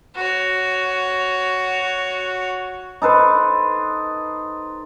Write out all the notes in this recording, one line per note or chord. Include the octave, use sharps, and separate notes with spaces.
F#4 C#5
D#4 A4 B4 C5